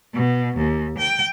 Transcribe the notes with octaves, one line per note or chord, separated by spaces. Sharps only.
B2
D#2
G5